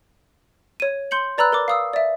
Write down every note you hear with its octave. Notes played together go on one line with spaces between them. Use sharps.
C#5 D#7
C6 G6 C#7 F#7
B4 D5 A#5 B5 E6 F#6
A#4 D5 D6
F5 D#6 E6
D5 E5